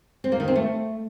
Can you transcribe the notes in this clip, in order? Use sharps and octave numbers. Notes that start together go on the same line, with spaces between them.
C4
A#3
D#3
C4
A3